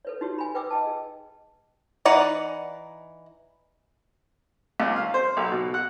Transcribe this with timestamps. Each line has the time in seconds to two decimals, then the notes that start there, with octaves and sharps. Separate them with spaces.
0.05 A4 B4 C#5
0.21 D#4 F#4 G4 C#5
0.38 G#5 B5
0.55 B4 G5 D6 E6
0.71 D#5 G5 A5
0.86 G#4
2.05 E3 D#4 D5 F#5
4.80 C#2
4.96 F5
5.14 C5
5.37 B1
5.52 B2
5.74 F#5